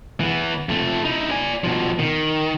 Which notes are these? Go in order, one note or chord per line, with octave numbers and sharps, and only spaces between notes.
E3 B3
F2 A3
D#4 E4
D5 G#5
B2 F3
D#3